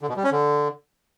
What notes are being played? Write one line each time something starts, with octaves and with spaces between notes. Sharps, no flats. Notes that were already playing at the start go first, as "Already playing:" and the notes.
D3
B2
G3
C#4
D3